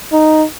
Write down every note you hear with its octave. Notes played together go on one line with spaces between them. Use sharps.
D#4